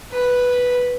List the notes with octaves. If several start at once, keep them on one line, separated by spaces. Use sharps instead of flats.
B4